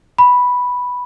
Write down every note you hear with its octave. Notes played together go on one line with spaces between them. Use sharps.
B5